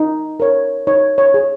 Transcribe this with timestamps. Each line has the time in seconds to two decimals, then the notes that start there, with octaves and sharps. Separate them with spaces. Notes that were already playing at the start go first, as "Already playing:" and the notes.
Already playing: D#4
0.40 A#4 C#5
0.87 D#4 C#5
1.18 C#5
1.34 G#4 C#5